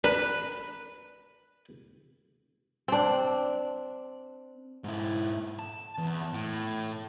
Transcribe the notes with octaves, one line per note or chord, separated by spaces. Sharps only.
D4 A#4 B4
C4 D4
G#2 E4
A5
E2
A2